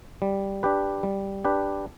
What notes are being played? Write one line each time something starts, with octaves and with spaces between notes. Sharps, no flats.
G3
D4 G4 B4
G3
D4 G4 B4